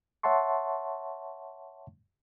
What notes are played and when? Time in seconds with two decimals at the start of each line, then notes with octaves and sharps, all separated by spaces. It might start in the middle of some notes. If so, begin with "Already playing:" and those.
0.23 C#5 E5 F#5 A5 C6 C#6